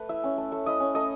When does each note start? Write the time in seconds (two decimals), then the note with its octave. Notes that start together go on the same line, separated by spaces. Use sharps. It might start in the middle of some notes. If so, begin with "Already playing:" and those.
Already playing: A3 B4
0.09 E4 E5
0.24 C#4
0.38 A3
0.52 A3
0.66 E4 D#5
0.80 C#4
0.95 A3 D#5